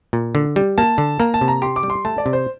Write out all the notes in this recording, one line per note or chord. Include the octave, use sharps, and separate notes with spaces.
A#2
D3
G3
A#3 A5
D3
A#3 A#5
A5
C3
A#5
G4 C6
D6
G3
C6
A3 A5
D5
C3
C5